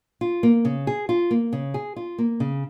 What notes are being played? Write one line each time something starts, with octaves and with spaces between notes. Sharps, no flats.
F4
A#3
C#3
G#4
F4
A#3
C#3
G#4
F4
A#3
C#3